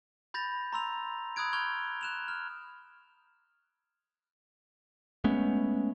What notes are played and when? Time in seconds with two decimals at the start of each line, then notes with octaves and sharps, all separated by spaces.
0.34 B5 G6 A6 A#6 F7
0.73 A#5 C6 E6 F7
1.36 B5 D#6 E6 F#6 G#6 D7
1.53 C#6 F6 G6 G#6 F7 G7
2.01 F#6 E7 F7
2.28 F6
5.24 G#3 A3 B3 C#4